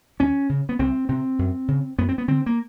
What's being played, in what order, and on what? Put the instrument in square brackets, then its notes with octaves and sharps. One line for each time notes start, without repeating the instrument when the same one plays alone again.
[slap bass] D#2 C#4
C#3
B3
C2 C4
C3 C4
F#2
C#3
F#2 B3
C4
B3
D3 C4
A#3